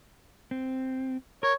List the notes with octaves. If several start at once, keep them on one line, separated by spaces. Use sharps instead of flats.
C4
A#4 C#5